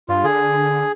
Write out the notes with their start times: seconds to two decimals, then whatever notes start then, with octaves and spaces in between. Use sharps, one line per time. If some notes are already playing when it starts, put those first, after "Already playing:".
0.08 G2 F4
0.24 D3 G#4